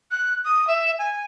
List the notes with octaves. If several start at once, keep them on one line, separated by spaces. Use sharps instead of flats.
F#6
D#6
E5
G#5